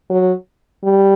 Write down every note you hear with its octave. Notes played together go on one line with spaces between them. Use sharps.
F#3
G3